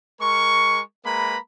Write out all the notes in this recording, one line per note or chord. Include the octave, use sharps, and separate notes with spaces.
G#3 A#4 C#6
G#3 A#3 B4 A#5 B5